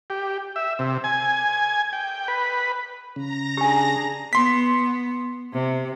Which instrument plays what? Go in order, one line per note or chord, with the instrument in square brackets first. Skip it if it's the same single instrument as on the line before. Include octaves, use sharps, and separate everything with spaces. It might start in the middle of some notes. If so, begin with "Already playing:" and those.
[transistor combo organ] G4
E5
C3
G#5
G5
B4
[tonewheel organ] C#3 [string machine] A#5 A#6
[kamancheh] D4 G#4 [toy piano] G4 G#5
[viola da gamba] B3 [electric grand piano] C6 B6
[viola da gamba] C3